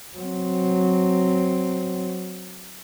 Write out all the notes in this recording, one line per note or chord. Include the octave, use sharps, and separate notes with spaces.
F#3 C4